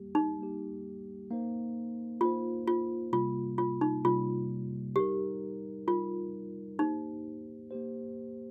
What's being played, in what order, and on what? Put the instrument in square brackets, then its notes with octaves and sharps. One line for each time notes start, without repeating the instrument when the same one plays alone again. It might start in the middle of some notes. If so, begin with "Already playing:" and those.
Already playing: [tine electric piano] G3 A#3 G4
[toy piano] D#4
[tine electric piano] G3 A#3 G4
A#3 D#4 C5
[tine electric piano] A#3 D#4 C5 [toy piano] F4
[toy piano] F4
[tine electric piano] C3 G3 A#3 [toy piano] F4
[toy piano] F4
D#4
[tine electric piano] C3 G3 A#3 [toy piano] F4
[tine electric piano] G3 D#4 A#4 [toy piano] G4
[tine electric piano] G3 D#4 A#4 [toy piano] F4
[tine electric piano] A#3 G4 C5 [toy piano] D#4
[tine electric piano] A#3 G4 C5